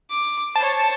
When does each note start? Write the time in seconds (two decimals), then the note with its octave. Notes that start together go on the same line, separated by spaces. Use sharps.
0.10 D6
0.56 C5 C#5 A5